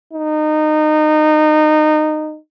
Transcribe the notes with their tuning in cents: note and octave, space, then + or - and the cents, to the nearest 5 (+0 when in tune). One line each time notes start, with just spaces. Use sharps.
D#4 -20